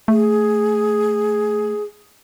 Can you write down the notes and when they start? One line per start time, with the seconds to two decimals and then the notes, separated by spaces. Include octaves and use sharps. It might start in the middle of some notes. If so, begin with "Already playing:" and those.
0.08 A3 G#4